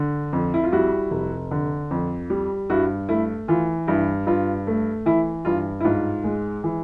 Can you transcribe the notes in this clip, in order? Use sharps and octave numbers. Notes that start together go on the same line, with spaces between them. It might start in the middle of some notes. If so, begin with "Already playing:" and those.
Already playing: D3
F2
E4
F4
G3 E4 F#4
F1
D3
F2
G3
G2 E4 F#4
A3 E4
E3 F4
G2 E4
G2 F4
A3
E3 E4
G2 F4
E4
G#2 F4
G#3
E3